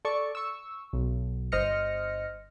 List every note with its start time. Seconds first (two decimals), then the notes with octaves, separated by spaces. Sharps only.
0.05 A4 D5 C#6
0.35 C#6 E6
0.93 B1
1.52 G1 C5 D#5 F6 A#6 C#7